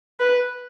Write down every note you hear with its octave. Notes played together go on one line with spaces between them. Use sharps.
B4